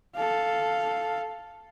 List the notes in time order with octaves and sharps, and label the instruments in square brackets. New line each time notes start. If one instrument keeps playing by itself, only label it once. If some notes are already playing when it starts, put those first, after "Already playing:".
[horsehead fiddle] A4 F5